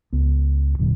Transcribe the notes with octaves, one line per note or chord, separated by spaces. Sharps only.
C#2 B3
E1 A#2 D3 F#3